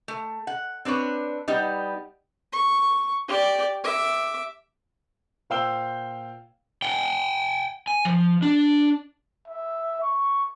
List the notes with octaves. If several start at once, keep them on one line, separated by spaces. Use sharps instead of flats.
A3
F#5
C4 D4 B4 C#5
G3 B3 D#4
C#6
G4 D5
E5 D6
A#2 C5 F5 G5 E6 G7
F#5 G5
G#5
F3
D4
E5
C#6